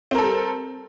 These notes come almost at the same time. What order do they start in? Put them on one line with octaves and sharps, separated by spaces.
C4 A#4 A4 G3